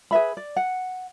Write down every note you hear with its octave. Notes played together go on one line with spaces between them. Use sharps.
G#4 B4 E5 B5
D5
F#5